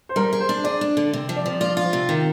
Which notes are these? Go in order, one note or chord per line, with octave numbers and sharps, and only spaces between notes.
C5
G3 A#4
G#4
C5
D4
G#4 D5
D4
D3
C3
F3
D5
F3
F4 D5
F4
C3
D#3